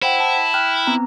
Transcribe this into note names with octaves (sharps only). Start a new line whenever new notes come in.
E4 C5 F#5 G5
A5
G5 F6 F#6
B3 C4 A#5